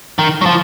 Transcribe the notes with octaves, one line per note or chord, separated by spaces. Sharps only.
D#3
F#3
F3